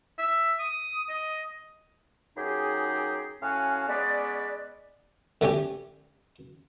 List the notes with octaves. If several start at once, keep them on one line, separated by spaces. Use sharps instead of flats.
E5
D#6
D#5
F#2 D#4 G4 G#4
A2 C#4 F#4 F5 G#5
G#3 B3 C#4 B4 D5
D3 A3 C#4 G4